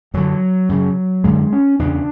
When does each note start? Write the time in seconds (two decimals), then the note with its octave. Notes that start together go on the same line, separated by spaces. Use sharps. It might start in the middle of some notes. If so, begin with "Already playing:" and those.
0.14 F#2 D3 F#3
0.69 F#2 C#3
1.24 F#2 D3 G#3
1.52 C#4
1.79 E2 C#3 D4